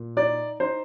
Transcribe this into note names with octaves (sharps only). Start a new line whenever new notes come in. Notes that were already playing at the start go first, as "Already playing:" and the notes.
Already playing: A#2
D#4 D5
D#4 C5